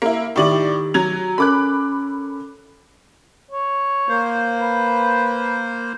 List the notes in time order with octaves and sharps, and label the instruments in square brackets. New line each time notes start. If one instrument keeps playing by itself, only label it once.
[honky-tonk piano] A#3 E4
[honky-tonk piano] A2 D5 F#7 [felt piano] D#3 G4 E5
[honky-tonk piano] F#3 G#6 F7
[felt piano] C#4 A4 A#4 [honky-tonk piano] B5 D6 F#6
[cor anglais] C#5
[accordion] A#3 C5
[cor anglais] B4